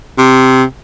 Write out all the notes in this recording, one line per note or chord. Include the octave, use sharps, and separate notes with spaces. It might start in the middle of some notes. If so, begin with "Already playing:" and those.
C3